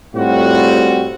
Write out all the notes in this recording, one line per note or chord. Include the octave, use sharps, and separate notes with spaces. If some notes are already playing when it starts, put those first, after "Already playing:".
A2 G3 C4 F4 F#4